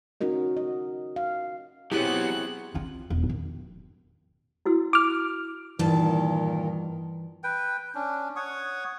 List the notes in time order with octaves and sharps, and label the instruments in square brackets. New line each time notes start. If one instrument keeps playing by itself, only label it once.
[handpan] C#4 D#4 F#4 A#4 D#5
D#5
F5
[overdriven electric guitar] F#3 B3 [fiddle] C4 F#6 [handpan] E4 G#4 C#5 [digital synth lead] G4
[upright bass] C4 F4
E1
D#3
[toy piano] E4 F#4 E6
[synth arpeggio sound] D6 F6
[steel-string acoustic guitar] G2 A5 [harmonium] A#2 D#3 [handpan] E3
[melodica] B4 G5
C#4 D4
C#5 F#5 C#6 D#6